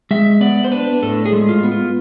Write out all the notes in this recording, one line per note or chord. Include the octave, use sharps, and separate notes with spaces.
G#3 E5
B3 D5
C5
D4 B4
A2 A4
G#4
G#3
F4
B3
F4